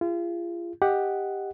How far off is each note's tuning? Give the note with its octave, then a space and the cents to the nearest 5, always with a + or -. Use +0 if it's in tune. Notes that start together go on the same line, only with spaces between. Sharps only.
F4 -35 G#4 -35
G4 +10 D#5 +0 F#5 +0